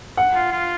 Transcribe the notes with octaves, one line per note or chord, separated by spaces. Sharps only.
F#5
F4
F4